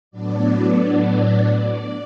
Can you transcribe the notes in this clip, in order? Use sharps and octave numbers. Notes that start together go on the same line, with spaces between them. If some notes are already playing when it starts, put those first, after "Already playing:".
A2 F#3 B3 D4 D5